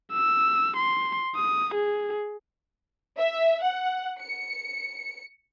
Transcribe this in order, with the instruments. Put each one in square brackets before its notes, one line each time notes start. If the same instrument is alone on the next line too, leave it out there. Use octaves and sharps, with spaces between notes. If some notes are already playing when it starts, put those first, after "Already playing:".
[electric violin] E6
C6
D#6
G#4
[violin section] E5
F#5
C#7